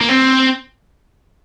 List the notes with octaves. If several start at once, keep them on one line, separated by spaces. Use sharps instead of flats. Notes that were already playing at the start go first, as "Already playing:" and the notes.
A#3
C4